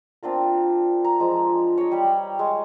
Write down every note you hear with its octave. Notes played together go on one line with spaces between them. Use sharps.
C4 D4 F4 A#4
A#5
F3 G#3
C#5 D#5
G3 G4
G#3